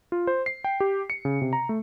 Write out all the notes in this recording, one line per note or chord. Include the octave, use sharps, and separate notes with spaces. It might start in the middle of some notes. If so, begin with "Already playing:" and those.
F4
C5
C7
G5
G4
C#7
C#3
C3
A#5
A3